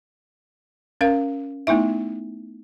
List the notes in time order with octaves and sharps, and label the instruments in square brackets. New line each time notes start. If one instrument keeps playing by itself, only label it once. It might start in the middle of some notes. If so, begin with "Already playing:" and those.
[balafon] C#4 A#4 F5
A3 B3 D#4 E4 E5